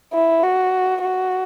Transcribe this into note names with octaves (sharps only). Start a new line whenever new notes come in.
E4
F#4
F#4